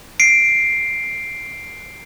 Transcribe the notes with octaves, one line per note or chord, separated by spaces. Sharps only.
C7 D7